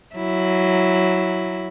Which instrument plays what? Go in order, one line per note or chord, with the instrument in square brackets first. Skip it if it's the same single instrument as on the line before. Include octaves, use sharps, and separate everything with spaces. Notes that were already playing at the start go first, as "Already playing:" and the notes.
[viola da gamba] F#3 E4